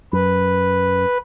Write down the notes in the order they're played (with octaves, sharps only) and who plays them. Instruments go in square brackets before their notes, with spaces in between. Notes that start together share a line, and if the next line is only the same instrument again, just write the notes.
[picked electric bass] F#2 [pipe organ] B4